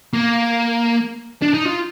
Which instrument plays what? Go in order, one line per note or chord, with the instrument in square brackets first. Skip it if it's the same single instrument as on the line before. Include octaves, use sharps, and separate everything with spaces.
[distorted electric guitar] A#3
D4
D#4
F4